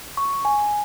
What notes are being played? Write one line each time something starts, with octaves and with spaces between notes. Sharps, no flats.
C#6
G#5